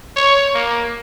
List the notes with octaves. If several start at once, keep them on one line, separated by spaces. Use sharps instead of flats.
C#5
A#3